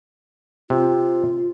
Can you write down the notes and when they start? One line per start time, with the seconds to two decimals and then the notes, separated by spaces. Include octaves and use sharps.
0.70 C3 F4